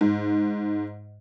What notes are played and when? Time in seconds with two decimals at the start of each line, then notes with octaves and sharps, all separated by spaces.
0.01 G#2